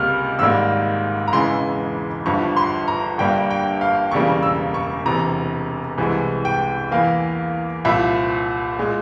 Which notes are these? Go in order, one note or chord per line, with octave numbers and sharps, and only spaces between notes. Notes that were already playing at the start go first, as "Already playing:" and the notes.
Already playing: C#2 C3 G3 A#3 F6
G#1 G#2 G3 A#3 E6
A#5
E1 E2 C#3 E3 G#3 C6
G1 G2 F3 C#6
C6
A#5
G1 G2 G3 A#3 G5
G5
F5
E1 E2 C#3 G3 A#3 C#6
E6
C#6
E1 E2 C3 A#5
C2 C3 E3 G#3
G5
E2 E3 A#3 F5
C2 A#2 F3 E5
A#2 G#3